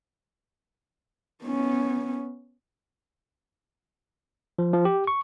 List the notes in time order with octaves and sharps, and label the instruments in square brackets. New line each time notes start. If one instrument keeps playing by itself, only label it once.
[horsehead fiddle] B3 C#4
[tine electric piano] F3
F3
G4
C#6